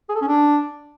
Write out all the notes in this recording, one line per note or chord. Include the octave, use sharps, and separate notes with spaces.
G#4
A4
C#4
D4